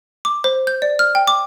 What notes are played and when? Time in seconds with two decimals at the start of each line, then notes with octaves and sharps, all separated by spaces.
0.25 D6
0.44 C5
0.67 G6
0.82 D5
0.99 F6
1.15 G5
1.27 D6